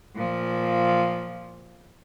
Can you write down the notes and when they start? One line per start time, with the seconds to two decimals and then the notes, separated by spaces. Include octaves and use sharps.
0.16 A#2 F3